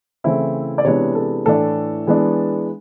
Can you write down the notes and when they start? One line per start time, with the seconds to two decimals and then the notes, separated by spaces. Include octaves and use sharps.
0.24 C#3 E3 A3 C4 E4
0.78 D5
0.84 C3 E3 G#3 B3 D4 C#5
1.15 A4
1.45 A2 E3 A3 D4 A4
2.07 E3 G#3 B3 D4